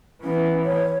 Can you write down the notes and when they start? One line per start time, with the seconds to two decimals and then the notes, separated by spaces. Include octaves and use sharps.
0.24 E3 B3 C#4
0.65 C#5